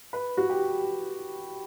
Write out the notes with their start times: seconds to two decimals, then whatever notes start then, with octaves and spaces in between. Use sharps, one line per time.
0.13 B4
0.37 F#4
0.50 G4